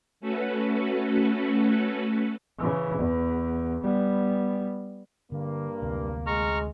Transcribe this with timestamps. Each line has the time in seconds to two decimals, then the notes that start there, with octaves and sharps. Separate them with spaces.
0.20 A3 C#4 F#4 A4 B4
2.58 C#3 E3
2.98 E2
3.83 G3 B3
5.32 G2 D3 A#3
5.82 D2 C3
6.27 G#3 A#5 C#6 F6